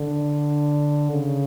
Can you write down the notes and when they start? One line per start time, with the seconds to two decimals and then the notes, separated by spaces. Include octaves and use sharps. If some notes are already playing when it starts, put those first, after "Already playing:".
Already playing: D3
1.11 C#3